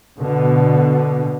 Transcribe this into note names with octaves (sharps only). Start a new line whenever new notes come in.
B2 D3